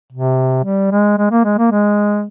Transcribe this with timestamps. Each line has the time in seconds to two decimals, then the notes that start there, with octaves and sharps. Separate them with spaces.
0.12 C3
0.65 G3
0.91 G#3
1.18 G#3
1.31 A#3
1.45 G#3
1.58 A#3
1.71 G#3